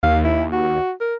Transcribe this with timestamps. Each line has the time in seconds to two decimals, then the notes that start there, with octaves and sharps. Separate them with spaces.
0.03 D#2 F5
0.25 E4
0.52 F#4
1.01 A#4